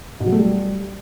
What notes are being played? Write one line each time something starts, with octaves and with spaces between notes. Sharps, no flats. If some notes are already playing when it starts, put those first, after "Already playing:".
B2
F#3
A3
G3